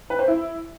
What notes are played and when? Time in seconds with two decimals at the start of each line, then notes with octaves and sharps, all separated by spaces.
0.10 B4
0.19 C5
0.28 E4